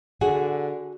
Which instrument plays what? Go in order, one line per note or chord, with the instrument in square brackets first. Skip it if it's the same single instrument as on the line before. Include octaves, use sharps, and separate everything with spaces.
[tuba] D3 [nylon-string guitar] F#4 G#4